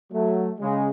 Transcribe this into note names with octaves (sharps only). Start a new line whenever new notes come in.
F#3 A3
C#3 G#3